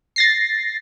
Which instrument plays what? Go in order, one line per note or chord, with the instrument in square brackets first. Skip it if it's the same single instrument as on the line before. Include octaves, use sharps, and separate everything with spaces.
[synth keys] A6 A#6 C7